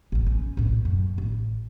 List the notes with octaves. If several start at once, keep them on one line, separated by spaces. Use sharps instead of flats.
A1 F2
C#4
A#1 A2
F#2
A1